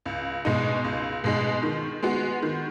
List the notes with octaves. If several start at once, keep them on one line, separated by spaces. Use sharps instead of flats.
C#2
B2 G#3 D#4
C#2
B2 G#3 D#4
D#3
G#3 B3 F#4
D#3